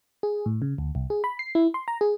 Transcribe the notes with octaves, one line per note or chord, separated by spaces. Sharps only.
G#4
A2
C#3
D2
C2
G#4
B5
C7
E4
C6
A#5
G#4